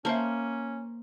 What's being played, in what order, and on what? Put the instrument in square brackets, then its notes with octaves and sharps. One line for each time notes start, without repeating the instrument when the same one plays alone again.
[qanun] A#3 C5 [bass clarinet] C#4 [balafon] E5 A5